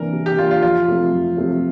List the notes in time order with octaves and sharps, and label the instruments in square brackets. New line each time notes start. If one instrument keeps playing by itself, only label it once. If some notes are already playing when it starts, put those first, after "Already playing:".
Already playing: [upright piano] C3 E3 A#3 D4 [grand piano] A#4
[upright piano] C3
[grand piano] G4
[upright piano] E3 A#3 D4 [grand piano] F4
[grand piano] F4
[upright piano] F2 [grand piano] F4
[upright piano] C3 F3 A3 C4
F2
C3 F3 A3 C4